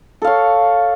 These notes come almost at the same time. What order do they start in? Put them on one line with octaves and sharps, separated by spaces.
A4 F5 C#5